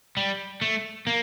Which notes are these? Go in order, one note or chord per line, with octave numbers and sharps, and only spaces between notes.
G3
A3
A#3